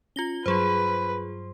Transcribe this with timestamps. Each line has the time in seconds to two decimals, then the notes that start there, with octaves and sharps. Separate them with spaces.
0.16 C#4 F4 A#6 G7
0.46 G2 F#3 F4 G#4 B4 C5 C6